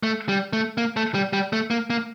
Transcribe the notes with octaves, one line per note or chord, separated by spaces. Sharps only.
A3
G3
A3
A#3
A3
G3
G3
A3
A#3
A#3